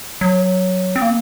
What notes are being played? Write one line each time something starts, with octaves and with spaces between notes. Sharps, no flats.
F#3
C4
A#3